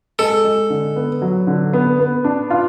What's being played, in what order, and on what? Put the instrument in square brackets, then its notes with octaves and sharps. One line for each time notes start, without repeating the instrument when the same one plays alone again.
[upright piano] G#3 [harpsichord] A4
[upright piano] G#3
D3
B3
F#3
D3
B3
B3
D4
F4